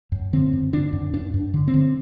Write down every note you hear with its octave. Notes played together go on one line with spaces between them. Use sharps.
F#2
D3 C4
F#2
D3 D4
F#2
F#2 D4
F#2
D3
C4
D3